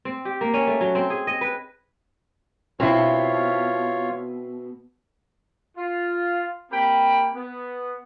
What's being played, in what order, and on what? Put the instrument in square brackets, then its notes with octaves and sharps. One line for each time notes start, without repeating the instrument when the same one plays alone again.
[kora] C4
G4
A#3
C#4
A3
F#3
C4
G#4
D#5
B4
[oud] B2 [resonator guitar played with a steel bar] C4 E4 [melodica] F4 C#5
[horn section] F4
A#3 C4 G4 G5 B5
B3